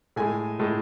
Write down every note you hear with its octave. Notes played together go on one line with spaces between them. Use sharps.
A2 G#3 G#5
A2 G#3